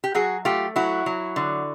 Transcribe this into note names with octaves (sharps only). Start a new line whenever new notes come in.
G4
F#3 F#4 G#4
A3 F4 G4
F#3 E4 F#4
F#3
D3